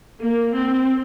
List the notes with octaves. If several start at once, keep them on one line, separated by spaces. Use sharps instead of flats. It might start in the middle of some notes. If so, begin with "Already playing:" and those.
A#3
C4